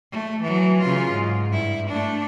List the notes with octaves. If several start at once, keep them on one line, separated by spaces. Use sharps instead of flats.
A3
E3 F#3
C#3 F4
G#2
G2 E4
A3 D4